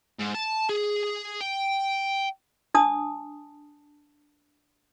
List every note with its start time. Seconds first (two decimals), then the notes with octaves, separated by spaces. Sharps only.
0.19 G#2
0.34 A5
0.69 G#4
1.41 G5
2.74 D4 A5 D#6